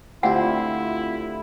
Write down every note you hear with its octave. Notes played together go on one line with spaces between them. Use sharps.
D2 C4 E4 F4 G4 F#5